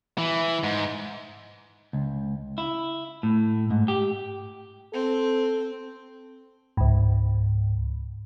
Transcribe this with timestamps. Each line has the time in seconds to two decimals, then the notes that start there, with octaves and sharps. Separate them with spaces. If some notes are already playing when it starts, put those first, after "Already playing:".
0.18 E3
0.64 G#2
1.93 C#2
2.58 E4
3.23 A2
3.70 G#2
3.88 G4
4.93 C4 A4
6.77 C#2 G#2